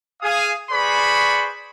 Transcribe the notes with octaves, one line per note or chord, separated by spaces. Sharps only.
G#4 F5 D#6
G#4 B4 C5 D5 B5 C#6